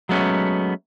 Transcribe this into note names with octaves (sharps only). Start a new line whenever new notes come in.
F#3 G#3 A3 B3 C#4